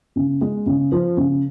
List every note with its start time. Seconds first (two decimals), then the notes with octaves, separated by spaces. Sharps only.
0.16 C#3
0.41 G#3
0.66 C#3
0.92 F3
1.17 C#3